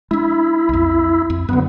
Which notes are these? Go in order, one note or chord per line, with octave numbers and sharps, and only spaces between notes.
G#3 D4 E4
B1 F2
F2
F#2 D3 B3